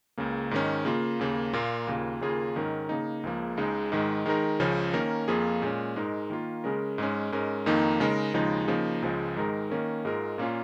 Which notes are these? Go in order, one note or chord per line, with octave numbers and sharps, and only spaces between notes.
C#2 C#3 A#3
G#2 D#3 C#4
C#3 A#3 F4
D#2 C#3 A#3
A#2 A#3 F4 A#4
D#2 C#3 A#3 F4
D#2 C#3 A#3 F4 G#4
G#2 D#3 C#4 A#4
C#3 A#3 D#4
C#2 C#3 F3 A#3
C#2 C#3 G#3 D#4
G#2 D#3 G#3
D#3 G#3 D#4 A#4
C#2 C#3 F3 C#4
D#3 A#3 C#4 A#4
F2 F3 A#3 F4 G#4
A#2 G#3 C#4
G#2 G#3 D#4 A#4
D#3 A#3 F4
C#3 G#3 C#4 A#4
G#2 G#3 C#4
G#2 G#3 C#4 A#4
F2 D#3 A#3 D#4
C#3 G#3 D#4 A#4
D#2 C#3 F3 G#3 D#4
C#3 F3 A#3 D#4
C#2 C#3 F3 G#3
G#2 D#3 G#3 D#4 A#4
D#3 A#3 C#4 A#4
G#2 G#3 F4 A#4
A#2 A#3 C#4 F4